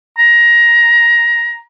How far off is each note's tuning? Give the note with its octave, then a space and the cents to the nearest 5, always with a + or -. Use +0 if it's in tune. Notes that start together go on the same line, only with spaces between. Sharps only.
A#5 +20